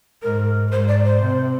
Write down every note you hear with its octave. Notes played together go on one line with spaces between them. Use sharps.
G#2 A#4
G#2 C5
D5
C5
C3